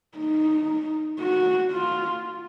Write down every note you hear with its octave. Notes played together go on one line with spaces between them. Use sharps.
D#4
F#4
F4